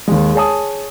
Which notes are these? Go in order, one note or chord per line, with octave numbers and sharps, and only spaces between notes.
D#2 G#3
G#4 C#5 G#5 A5 D#6